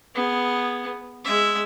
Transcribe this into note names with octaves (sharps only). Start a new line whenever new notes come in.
B3 G#4
G#3 E5